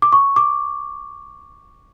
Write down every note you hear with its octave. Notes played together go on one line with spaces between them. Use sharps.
D6
C#6
D6